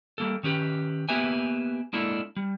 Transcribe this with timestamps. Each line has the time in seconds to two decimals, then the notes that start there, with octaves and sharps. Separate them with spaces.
0.18 G3 A#3 A4
0.43 D#3 C#4 G4 B4
1.09 A#3 B3 G4 B4 E5 G#5
1.93 G#3 A#3 D4 E4 A4
2.36 G3